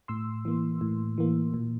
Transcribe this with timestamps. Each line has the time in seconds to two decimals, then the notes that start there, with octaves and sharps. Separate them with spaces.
0.08 A2 C6 E6
0.45 E3 A#3
0.81 A2
1.18 E3 A#3
1.54 A#2